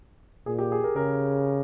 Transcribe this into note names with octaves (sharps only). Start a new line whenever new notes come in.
A#2 G#4
G4
G#4
A#4
C#3 A#4